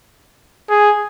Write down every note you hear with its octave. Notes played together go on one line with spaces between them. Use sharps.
G#4